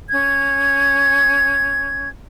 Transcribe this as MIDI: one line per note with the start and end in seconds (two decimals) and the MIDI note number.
0.09 2.09 61
0.09 2.09 92